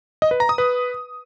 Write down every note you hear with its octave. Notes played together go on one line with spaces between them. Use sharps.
D#5
B4
A#5
D#6
B4